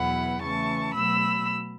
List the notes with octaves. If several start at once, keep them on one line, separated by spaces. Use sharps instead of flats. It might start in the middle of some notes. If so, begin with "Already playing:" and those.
Already playing: E2 B2 F#3 B3 E4 F#5 B5
C#3 E3 A3 A5 C#6
B2 F#3 A3 B5 E6